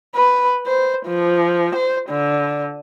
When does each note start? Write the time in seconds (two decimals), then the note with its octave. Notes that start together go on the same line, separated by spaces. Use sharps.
0.15 B4
0.67 C5
1.06 F3
1.75 C5
2.09 D3